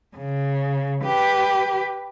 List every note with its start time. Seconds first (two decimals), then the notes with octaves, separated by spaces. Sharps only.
0.17 C#3
1.04 G4 B4